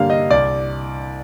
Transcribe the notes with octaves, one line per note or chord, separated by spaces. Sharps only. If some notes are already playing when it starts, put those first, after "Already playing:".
Already playing: G2 D3 G3 A#3 F5
D#5
C2 D5